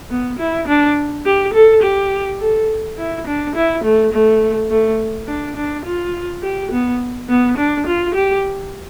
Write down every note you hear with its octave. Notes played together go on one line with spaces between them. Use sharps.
B3
E4
D4
G4
A4
G4
A4
E4
D4
E4
A3
A3
A3
D4
D4
F4
G4
B3
B3
D4
F4
G4